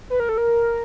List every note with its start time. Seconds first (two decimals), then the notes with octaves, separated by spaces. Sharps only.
0.10 B4
0.20 A#4
0.29 A4
0.38 A#4